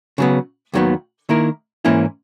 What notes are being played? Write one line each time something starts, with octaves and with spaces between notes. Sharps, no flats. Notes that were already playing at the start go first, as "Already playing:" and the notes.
C#3 F#3 B3
D#2 D#3 F#3 B3
D#3 A#3 E4 A#4
G#2 E3 A#3 C#4 E4